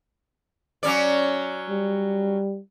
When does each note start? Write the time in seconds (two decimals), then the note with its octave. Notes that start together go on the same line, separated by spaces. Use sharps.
0.83 F#3 C#4 D5
1.69 G3